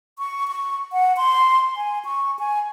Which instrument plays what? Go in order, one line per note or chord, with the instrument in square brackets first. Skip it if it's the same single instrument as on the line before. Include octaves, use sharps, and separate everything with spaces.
[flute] C#6
C#6
F#5
C6
G#5
C#6
G#5